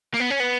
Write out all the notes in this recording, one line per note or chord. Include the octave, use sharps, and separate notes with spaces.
A#3
B3
C#4
B3